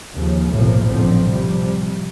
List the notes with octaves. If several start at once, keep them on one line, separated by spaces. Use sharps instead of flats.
D#2 C#3 F3
F#1 B1 A2 C3 F3 A#3
A1 A#2 D3 F3 C4
C3 F3 G3